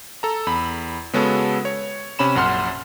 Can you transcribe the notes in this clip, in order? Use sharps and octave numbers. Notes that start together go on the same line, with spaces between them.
A4 A#5
E2 B5
C#3 G#3 B3 C#4 F#4 A4
C#5
C3 C#4 B5 E7
A#1 F#2 F#5 C6 F6